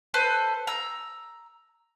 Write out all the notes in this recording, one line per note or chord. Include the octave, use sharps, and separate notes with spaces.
A4 B4 C5
A#5 E6